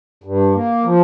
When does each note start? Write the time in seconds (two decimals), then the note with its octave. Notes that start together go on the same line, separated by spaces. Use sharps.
0.24 G2
0.55 A#3
0.84 F3